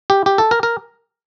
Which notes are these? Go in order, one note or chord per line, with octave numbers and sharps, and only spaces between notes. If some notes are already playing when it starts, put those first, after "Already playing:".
G4
G4
A4
A#4
A#4